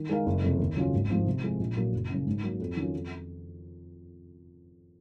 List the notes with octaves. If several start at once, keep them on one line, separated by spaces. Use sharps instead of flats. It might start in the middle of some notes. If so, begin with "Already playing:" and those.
Already playing: D#3
G#3 D#4 A#4 F5
F#1
F2 C3
D#2
C#3 F#3 C#4 F4
G#1
G#2 F3 C4
C3
F3 G#3
A#1
A#2 F#3 A#3
F#1
F#2 C#3
G#2
F#3 A#3
F2
D#3 F#3 C#4 F4
F2